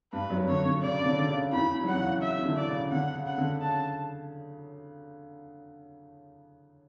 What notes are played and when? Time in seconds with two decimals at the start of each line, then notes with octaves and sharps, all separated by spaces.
0.13 G2 G3 B4
0.30 F#2 F#3
0.48 D3 C#5
0.65 D3
0.82 C#3 D5
1.02 C#3
1.06 D3
1.18 D3
1.29 C#3
1.53 E2 E3 B5
1.75 E3
1.83 F#3
1.88 E2 E3 F#5
1.99 C#3
2.22 E5
2.39 E3
2.45 D3
2.57 D5
2.68 C#3
2.91 D3 F#5
3.15 C#3
3.27 F#5
3.38 D3
3.61 C#3 A5